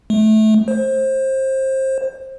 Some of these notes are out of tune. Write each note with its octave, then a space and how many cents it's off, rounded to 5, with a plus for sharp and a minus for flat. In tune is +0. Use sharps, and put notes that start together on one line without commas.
A3 -20
C5 +25